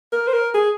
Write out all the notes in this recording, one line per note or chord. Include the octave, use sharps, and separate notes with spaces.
A#4
C5
A#4
G#4